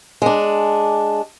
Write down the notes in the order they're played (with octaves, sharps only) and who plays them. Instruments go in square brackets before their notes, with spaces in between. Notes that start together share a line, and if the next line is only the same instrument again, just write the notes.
[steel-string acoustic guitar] G#3 D4